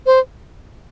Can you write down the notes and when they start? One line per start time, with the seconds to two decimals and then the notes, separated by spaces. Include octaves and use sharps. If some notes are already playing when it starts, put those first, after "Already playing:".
0.06 C5